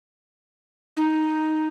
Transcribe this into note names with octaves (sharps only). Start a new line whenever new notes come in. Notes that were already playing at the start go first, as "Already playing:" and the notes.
D#4